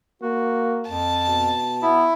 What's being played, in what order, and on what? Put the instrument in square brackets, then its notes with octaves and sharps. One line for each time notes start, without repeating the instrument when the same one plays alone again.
[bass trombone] A#3 [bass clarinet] F#4
[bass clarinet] F2 [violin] A5
[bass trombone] B2
[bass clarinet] B3 [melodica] E4